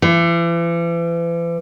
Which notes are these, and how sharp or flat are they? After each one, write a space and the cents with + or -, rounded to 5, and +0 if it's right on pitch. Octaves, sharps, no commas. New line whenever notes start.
E3 +40